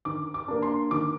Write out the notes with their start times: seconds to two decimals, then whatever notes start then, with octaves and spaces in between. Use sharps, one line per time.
0.05 D#3 D6
0.34 D6
0.48 A#3 D4
0.62 C6
0.91 D#3 D6